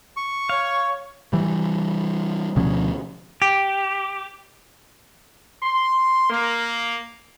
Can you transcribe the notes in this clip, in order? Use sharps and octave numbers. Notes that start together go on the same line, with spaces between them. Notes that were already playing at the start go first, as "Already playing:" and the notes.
C#6
C#5 F5
E3 G3
D2 B2 F3 C#4
G4
C6
A#3